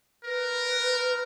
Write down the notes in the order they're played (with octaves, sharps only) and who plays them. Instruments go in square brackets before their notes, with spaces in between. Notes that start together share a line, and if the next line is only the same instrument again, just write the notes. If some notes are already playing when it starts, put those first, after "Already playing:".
[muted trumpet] A#4 [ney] B4